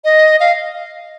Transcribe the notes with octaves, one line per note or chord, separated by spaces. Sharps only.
D#5
F5